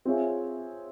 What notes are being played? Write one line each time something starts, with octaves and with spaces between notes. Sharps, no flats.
C4 F4 G#4 C#5 E5